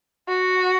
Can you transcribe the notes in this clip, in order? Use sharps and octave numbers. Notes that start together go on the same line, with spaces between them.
F#4